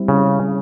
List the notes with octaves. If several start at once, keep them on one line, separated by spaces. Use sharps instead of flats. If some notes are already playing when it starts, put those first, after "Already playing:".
Already playing: G3 C4 E4
C#3